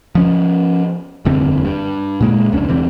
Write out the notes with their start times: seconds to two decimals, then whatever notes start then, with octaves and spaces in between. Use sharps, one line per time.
0.15 F3 C#4
1.25 E1 F#2 D3 C4
1.64 G2
2.21 A#2 G#3 A#3
2.52 F1 C#2 C#4 D4
2.68 E1 B2 E3 C4